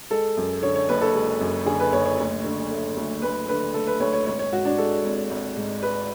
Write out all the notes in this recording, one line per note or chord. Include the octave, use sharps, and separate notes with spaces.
G#3 A4
F#2
D3 C#5
C#5
F#1 B4
A4
G#3
F#2
D3 G#4
B4
F#1 C#5
C#5
D2
D3
A3
D2
D2 B4
D3 B4
A3 A4
B4
D2 C#5
C#5
G#1 C#5
C#5
G#2 F#4
D4
G#3 A4
G#1
G#1
G#2
G#3 B4